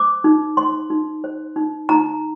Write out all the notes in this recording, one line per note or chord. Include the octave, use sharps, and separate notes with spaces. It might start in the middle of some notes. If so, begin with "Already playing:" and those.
Already playing: C5 D6
D#4
C5 C6
D#4
C5
D#4
D#4 A#5